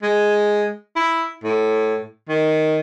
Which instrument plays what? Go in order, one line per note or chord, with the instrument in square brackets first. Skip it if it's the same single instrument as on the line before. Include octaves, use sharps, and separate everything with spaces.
[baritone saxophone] G#3
E4
A2
D#3